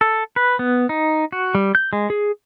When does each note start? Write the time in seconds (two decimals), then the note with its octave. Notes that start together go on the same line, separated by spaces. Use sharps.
0.01 A4
0.36 B4
0.59 B3
0.89 D#4
1.32 F#4
1.55 G3
1.75 G6
1.93 G#3
2.10 G#4